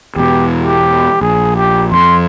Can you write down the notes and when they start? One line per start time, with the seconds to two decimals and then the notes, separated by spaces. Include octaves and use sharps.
0.16 E2 B2 G4
0.61 G4
1.21 A#1 G#4
1.56 G4
1.92 F2 C6